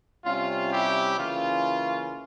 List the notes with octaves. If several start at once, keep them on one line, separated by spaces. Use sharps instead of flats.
C3 G3 C#4 F4
E4 G4
C#3 E3 A#3 C#4 F4